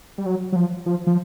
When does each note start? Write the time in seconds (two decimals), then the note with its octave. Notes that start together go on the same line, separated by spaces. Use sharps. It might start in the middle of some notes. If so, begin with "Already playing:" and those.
0.18 G3
0.26 F#3
0.52 F#3
0.56 F3
0.86 F3
1.07 F3